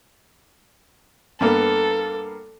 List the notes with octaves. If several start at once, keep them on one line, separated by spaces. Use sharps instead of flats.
G2 A#3 B3 A4